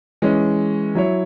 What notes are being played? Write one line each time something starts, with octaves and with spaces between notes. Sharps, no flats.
E3 G#3 C#4
F#3 E4 C#5